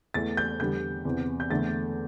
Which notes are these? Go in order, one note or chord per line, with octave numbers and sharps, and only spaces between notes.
E2 E3 A3 A6
G6
E2 D3 G3 G6
E2 C3 E3
G6
E2 D3 A3 A6